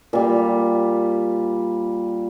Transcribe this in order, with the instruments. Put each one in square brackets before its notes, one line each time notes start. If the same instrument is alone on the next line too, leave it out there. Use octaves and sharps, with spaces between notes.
[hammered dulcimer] A#2 G3